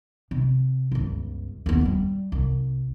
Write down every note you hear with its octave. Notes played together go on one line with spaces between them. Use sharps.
C3
G1 C#2
D#2 B3
F3 G3
C2